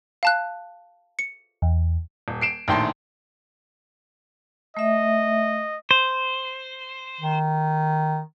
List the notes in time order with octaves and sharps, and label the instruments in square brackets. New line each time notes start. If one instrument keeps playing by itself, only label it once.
[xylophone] F5 A5 F#6
C#7
[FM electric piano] E2
[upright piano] D#1
C7 D7 E7
A#1 A2 D#3 G5 A5 C6
[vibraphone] A3 E5 [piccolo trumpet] D#5
[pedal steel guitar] C5
[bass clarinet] D#3